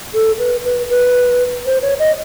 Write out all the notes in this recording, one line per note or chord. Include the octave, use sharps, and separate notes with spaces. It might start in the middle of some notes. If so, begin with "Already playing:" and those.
A4
B4
B4
B4
C5
C#5
D#5